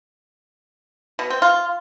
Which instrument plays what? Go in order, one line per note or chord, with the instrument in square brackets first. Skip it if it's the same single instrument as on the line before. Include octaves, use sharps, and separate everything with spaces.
[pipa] B2
C4
F4